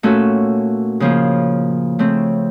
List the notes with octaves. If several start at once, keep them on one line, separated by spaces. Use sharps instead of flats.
A#2 A3 C#4 F#4 A4
C#3 F3 A#3
C#3 A3 C4